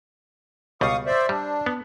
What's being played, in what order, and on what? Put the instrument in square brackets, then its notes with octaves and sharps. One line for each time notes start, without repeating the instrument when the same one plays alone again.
[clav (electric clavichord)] C#2 B2 G3 [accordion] F5 C#6 D#6
[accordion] C5 D5 E5
[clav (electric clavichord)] G3 [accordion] D4
[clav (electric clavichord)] B3